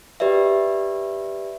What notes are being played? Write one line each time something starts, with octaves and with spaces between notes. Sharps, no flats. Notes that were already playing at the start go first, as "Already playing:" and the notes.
G4 B4 D5 E5